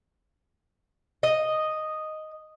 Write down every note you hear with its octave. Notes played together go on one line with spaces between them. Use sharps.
D#5